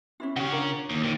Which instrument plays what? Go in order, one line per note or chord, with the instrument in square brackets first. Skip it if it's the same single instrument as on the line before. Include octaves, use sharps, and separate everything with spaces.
[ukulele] C#4 E4 F4
[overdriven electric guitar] C#3 C#5 [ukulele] G4 F#5
[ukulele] D4 F4 A#4
[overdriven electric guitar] D#2
A#2 D#3